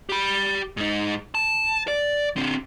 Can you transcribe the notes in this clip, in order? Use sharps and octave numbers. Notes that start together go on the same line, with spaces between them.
G4 B5
G#2 D#4
A5
D5
D3 C4